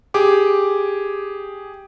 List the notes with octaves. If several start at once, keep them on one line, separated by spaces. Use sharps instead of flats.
G4 G#4 D6